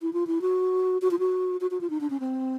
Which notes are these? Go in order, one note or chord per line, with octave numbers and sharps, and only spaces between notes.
E4
F4
E4
F#4
F#4
F4
F#4
F#4
F#4
F4
D#4
D4
C#4
C4